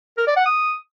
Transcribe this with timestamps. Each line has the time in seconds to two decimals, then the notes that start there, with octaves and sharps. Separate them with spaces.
0.18 A#4
0.27 D5
0.37 F#5
0.46 D#6